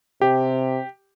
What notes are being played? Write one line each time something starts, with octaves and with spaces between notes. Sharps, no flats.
C3 G4